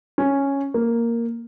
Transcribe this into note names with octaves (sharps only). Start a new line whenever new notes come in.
C#4
A#3